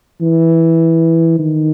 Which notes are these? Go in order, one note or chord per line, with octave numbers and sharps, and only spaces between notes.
E3
D#3